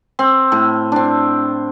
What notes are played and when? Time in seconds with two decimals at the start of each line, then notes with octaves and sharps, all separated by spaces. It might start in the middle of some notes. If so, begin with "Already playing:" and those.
0.19 C4
0.52 A2
0.92 C4 D4